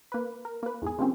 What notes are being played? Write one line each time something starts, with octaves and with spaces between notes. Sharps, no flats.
A#3 B4
A#4
A#3 B4
E2 G#2 G#4
C3 F3 A#3 C4 C#4